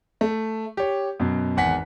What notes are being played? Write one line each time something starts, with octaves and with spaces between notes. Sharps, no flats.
A3
G4 C#5
F#2 B2
G#1 E2 F#5 G#5 B6